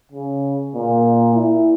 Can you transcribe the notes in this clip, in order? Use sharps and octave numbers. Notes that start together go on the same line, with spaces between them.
C#3
A#2
E4